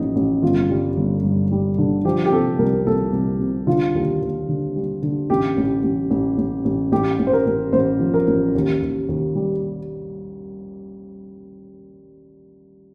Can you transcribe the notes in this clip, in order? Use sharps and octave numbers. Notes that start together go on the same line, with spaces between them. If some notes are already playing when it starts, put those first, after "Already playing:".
Already playing: A1 A2 F3 D#4
A1
G1 F4
G3
G1
G2
G3
D3
F3 G4
G4
C3 A4
C2 A#4
C2 A4
C2
C3
D3 F4
D#2
D#2
D3
G3
D3
A1 G4
A1
A1
A1
A1
A1
A1 G4
A1
C5
A#4
A1
A1 C5
F3
A#4
A1
D#2
D#2
D#2
G3